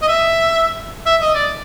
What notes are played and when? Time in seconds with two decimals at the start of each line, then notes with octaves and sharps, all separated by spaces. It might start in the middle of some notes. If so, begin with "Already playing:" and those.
0.02 D#5
0.08 E5
1.06 E5
1.21 D#5
1.35 D5